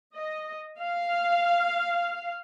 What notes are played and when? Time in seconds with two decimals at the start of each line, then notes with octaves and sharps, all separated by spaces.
0.16 D#5
0.80 F5